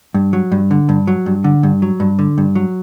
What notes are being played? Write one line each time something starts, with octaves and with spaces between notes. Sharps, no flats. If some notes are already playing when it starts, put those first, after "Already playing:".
G2
F#3
G2
D3
G2
F#3
G2
D3
G2
F#3
G2
D3
G2
F#3